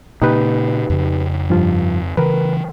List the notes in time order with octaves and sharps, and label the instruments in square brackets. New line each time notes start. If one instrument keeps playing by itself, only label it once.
[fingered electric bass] A#2 C#3 A#3 [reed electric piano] D#4 G4 B4
[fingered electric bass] F2 C#3
[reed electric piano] G2 F3 F4
[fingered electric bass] C#3 E3 [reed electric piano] A#4 B4